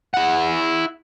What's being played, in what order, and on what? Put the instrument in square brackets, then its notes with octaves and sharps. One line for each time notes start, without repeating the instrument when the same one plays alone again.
[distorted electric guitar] E4 F#5